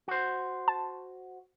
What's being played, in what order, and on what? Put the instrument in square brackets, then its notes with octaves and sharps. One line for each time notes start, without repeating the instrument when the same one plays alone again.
[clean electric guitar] F#4 C5
[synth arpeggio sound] A5